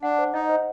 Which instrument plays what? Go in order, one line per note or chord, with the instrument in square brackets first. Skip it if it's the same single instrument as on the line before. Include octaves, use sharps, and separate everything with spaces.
[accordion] D4 [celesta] F#5
[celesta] C5
[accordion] D#4 [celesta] D#5
[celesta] C5